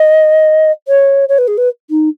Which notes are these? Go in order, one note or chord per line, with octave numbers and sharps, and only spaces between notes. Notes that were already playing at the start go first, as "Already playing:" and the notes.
Already playing: D#5
C#5
C#5
B4
G#4
B4
D#4